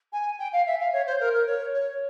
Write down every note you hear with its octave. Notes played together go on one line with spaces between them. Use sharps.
G#5
G5
F5
E5
F5
C#5
C5
A#4
A#4
C#5
C#5